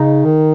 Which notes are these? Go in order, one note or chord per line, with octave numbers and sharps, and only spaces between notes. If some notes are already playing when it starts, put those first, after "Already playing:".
Already playing: C#3 D#4
D#3